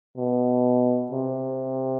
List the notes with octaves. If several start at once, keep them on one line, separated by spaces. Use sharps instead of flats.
B2
C3